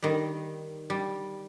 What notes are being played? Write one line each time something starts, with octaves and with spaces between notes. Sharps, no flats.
D#3 G3
G3